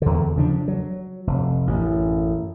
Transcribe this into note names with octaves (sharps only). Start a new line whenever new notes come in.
E2 D3
C#3 F3 D4
F#3
F1
A1 F#2